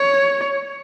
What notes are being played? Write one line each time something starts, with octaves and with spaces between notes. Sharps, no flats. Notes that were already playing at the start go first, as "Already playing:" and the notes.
Already playing: C#5